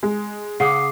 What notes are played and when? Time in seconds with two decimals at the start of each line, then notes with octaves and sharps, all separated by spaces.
0.03 G#3
0.60 C#3 F#5 D6 D#6 C7